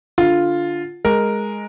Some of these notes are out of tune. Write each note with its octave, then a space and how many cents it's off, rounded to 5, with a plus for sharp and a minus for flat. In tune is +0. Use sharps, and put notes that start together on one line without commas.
D3 +0 F4 +0
G#3 +0 A#4 +0